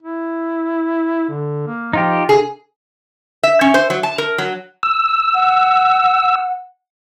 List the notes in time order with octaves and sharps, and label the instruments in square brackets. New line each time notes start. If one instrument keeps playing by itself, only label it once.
[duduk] E4
D3
A#3
[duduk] F3 [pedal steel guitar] D#4 F4 G4
[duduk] C3 [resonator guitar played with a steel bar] G#4
[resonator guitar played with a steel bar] E5
C#4
C5
F#3
A5
A#4
F#3
[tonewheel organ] E6
[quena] F#5